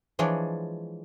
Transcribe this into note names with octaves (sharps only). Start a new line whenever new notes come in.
E3 F3 G#3 D4 C#5